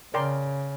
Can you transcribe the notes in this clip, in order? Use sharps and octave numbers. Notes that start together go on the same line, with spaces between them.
C#3 A#4 D5 G5 C6